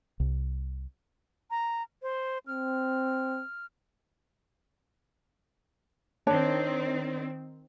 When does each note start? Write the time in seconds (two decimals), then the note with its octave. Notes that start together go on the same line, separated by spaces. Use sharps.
0.20 C2
1.51 A#5
2.02 C5
2.47 C4 F6
6.27 D#3 C4 D4 C#5 A5